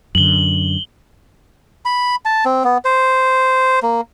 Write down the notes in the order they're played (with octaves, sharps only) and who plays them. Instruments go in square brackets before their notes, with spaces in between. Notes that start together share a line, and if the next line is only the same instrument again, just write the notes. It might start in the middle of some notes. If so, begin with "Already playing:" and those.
[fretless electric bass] F#2 D3 [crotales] F#7 G7
[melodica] B5
A5
C4
B3
C5
A#3